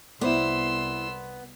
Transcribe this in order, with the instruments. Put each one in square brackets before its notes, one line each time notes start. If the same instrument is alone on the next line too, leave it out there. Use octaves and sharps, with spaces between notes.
[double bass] C2 [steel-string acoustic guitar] B3 [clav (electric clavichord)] E4 C5 D5 [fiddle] C6 E6